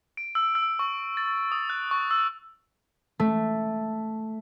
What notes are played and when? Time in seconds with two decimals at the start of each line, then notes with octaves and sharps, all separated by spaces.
0.17 D7
0.35 E6
0.55 E6
0.79 C#6
1.17 A6
1.52 D#6
1.70 F#6
1.91 C#6
2.11 E6
3.20 A3